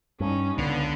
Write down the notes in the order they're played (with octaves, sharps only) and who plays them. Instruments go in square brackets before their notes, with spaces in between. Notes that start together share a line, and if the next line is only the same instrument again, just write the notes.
[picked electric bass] G2 [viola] C#4 D#4
[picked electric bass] C#2 [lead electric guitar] D3 [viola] B3